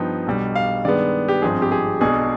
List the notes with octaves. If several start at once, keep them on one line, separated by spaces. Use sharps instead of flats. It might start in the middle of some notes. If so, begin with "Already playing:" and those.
Already playing: G2 F3 B3 D#4 G5
B1 B2 G3 D4
F5
G2 D#3 G#3 B3 D5
G4
G#1 G2 F3 C4 G#4
G4
G#4
B1 B2 G#3 D4 G#4